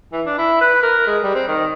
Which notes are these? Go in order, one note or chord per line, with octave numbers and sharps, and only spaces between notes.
E3
D4
E4
B4
A#4
G#3
G3
C4
D#3